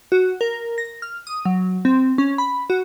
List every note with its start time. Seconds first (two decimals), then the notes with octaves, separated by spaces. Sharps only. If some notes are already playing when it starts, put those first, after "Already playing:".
0.12 F#4
0.41 A#4
0.78 A#6
1.02 F6
1.27 D#6
1.45 F#3
1.85 C4
2.18 C#4
2.38 B5
2.70 F#4